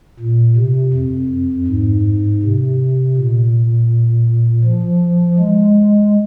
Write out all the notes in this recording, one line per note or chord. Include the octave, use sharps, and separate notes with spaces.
A#2
C3
F2
G#2
C3
A#2
F3
G#3